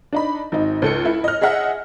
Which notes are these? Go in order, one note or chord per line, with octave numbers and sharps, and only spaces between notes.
D4 D#4 B5
G#1 D#4
C#2 A4 C#7
E4
D#5 F6
G#4 D#5 E5 F#5